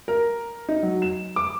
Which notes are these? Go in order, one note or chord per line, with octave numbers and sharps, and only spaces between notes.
A#4
D#4
F#3
E7
D6